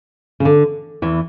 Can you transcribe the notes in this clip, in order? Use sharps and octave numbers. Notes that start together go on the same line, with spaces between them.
C#3
D3
E2 E3